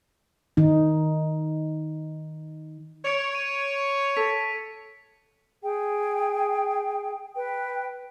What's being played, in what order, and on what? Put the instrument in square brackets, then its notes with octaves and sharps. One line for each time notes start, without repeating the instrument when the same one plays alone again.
[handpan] D#3 D#4
[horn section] C#5 [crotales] C#7 D7 F7
[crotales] D#7
[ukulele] A4 [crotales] B6
[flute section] G#4 G5
B4 G5